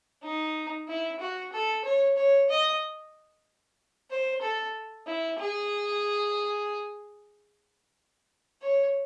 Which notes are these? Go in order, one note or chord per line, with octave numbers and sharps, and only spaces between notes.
D#4
E4
F#4
A4
C#5
C#5
D#5
C5
A4
E4
G#4
C#5